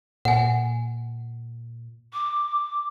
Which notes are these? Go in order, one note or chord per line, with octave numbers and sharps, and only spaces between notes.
A#2 F#5 G#5
D6